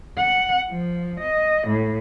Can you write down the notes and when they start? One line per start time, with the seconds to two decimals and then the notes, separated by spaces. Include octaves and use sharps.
0.17 F#5
0.70 F3
1.20 D#5
1.67 A2